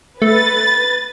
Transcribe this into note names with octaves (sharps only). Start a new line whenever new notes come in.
A3 B4 A6